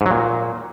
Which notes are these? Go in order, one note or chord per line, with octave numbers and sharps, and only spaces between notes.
G#2
F#3
A#2